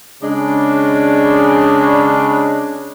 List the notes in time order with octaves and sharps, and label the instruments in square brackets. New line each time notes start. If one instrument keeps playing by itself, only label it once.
[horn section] C#3 G#3 D4